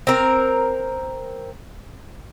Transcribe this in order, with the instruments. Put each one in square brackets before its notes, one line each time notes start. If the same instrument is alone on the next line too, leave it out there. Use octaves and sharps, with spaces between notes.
[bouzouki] C4 A#4